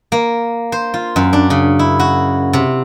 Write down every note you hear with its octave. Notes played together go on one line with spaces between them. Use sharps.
A#3
C5
F4
F#2
D4
C#3
E4
F#4
C3